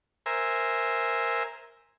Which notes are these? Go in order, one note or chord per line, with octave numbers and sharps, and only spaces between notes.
A#4 C5 E5 G#5